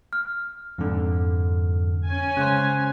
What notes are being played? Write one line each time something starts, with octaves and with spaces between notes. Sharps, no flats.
F6
F2 G#2 D3
C#4 G#5
C#3 G#3 C5 F#6